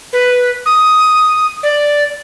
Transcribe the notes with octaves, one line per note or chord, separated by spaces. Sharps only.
B4
D#6
D5